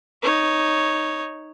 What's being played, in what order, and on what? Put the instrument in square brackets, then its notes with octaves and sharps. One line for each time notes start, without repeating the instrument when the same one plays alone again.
[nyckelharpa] D#4 C#5